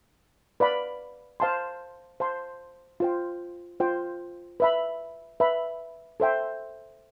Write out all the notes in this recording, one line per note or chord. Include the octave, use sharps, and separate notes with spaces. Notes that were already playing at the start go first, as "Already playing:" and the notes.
B4 D5 F5 B5
C5 F5 A5 C6
C5 F5 A5 C6
F4 C5 G5
F4 C5 G5
B4 E5 B5
B4 E5 B5
A4 C5 E5 G5